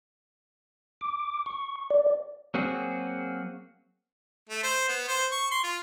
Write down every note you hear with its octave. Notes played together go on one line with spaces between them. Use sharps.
D6
C#6
D5
F#3 A#3 C4 F#4 G#4
A3
C5
B3
C5
C#6
C6
F4